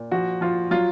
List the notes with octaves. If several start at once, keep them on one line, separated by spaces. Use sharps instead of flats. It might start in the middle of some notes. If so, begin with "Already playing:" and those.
Already playing: A#2
F3 F#4
F3 F4
F#3 F4